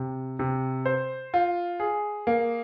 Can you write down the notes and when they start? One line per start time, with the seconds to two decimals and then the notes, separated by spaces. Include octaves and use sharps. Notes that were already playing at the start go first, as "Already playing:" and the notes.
Already playing: C3
0.39 C3
0.86 C5
1.34 F4
1.80 G#4
2.27 A#3